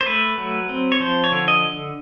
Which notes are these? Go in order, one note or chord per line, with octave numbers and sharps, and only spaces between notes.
C5
A3 B4
F#3
C4
C#5
F3 C5
C#5
D3
D#5